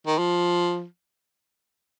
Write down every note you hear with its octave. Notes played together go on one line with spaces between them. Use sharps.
D#3
F3